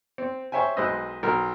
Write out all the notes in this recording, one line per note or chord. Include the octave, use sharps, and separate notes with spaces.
C4
C5 C#5 E5 G5 G#5
B1 G#3 B4 C5 D#5 E6
B1 A#4